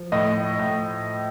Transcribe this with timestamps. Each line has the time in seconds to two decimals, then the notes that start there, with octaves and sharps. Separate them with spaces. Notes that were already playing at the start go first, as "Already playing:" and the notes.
Already playing: F3
0.12 A2 D#5
0.59 A2